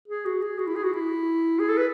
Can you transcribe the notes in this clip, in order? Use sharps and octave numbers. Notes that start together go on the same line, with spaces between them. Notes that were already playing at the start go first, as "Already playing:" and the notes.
G#4
F#4
G#4
F#4
E4
G#4
F#4
E4
G#4
A4
B4